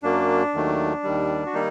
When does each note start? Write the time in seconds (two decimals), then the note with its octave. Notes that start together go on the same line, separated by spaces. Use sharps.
0.03 F#2 F#3 A#3 D4
0.54 D#2 D#3 F#3 A3
1.03 D#2 D#3 G3
1.46 F#4
1.54 D#3 G3 A#3 D#4